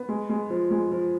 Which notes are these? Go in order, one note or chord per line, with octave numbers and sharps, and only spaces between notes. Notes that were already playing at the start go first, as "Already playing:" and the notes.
Already playing: B3
G#3
G#3
F3
G#3
F3